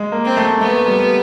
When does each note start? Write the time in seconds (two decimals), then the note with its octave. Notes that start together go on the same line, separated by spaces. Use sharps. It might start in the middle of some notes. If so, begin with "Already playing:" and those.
Already playing: G#3
0.12 A#3
0.24 C4
0.37 A3
0.61 A3 B3
0.86 G3